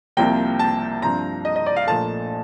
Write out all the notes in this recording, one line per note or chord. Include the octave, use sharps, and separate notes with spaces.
C2 C3 F3 A#3 G5
A5
G2 F3 C4 A#5
D#5
D#5
D5
F5
A#1 A#2 A3 A5